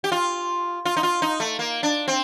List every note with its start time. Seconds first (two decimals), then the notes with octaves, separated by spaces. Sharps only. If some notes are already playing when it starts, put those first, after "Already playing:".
0.04 G4
0.12 F4
0.85 F4
0.97 D#4
1.03 F4
1.22 D#4
1.40 A3
1.59 A#3
1.83 D4
2.08 C4